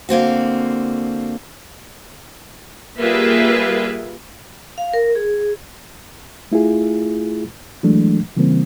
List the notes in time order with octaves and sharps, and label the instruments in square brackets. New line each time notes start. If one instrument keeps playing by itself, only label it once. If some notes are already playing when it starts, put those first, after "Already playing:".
[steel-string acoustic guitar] D3 A#3 C4 F#4
[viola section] G3 A#3 F4 G#4 B4 E5
[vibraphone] F5
A#4
G#4
[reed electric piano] A3 E4 F4 G#4
E3 F#3 G#3 A3 D4
C#3 E3 G3 A#3 C4